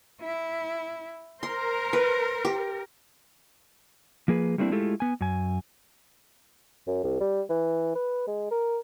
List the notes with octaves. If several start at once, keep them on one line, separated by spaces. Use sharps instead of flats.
E4
A#4 C5 C6
B4
G4
F3 A#3 G#4 B4
G3 A3 A#3 C4 D4 E4
G#3 A3 E4 F4 G4 A4
B3 G#5
F#2 G#5
F#2
C2
G3
E3
B4
G#3
A#4